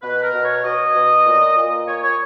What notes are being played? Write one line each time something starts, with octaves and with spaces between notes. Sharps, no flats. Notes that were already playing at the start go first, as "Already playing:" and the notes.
B2 B4
A#4
B2
C#5
B2 D#5
B2
A#2
A#2
A#2 C#5
C#5